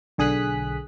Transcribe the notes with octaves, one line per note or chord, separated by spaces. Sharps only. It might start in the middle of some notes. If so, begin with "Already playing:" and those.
B1 D3 G#4 D#6 F#6 B6